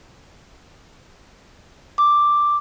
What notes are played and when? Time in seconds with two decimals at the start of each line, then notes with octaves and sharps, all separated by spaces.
1.98 D6